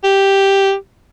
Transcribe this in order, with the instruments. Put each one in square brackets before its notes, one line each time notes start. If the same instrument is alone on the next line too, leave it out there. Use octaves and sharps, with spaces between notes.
[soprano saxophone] G4